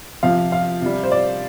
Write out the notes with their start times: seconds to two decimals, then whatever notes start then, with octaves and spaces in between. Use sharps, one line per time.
0.23 C3 F3 F5
0.52 F5
0.81 C3 G3
1.04 C5
1.12 D5